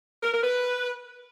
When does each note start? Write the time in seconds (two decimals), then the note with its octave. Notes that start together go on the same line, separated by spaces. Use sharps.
0.23 A#4
0.33 A#4
0.43 B4